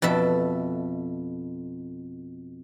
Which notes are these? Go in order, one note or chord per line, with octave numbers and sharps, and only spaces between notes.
F2 B2 A4 E5